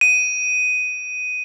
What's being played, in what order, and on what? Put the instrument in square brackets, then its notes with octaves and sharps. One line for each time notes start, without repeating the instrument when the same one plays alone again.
[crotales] D#7